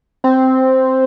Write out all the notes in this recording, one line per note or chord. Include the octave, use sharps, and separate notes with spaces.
C4